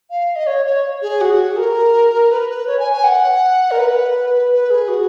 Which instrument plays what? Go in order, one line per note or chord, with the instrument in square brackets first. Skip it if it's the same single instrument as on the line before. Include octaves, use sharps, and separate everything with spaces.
[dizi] F5
D#5
C#5
C#5
G#4
F#4
A#4
B4
B4
C#5
G#5
G#5
F#5
A#4
B4
B4
G#4
F#4